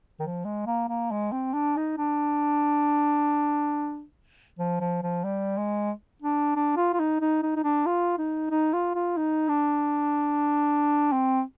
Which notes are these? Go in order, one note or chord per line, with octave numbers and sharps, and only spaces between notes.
D#3
F3
G#3
A#3
A#3
G#3
C4
D4
D#4
D4
F3
F3
F3
G3
G#3
D4
D4
F4
F4
D#4
D#4
D#4
D#4
D4
F4
D#4
D#4
F4
F4
D#4
D4
C4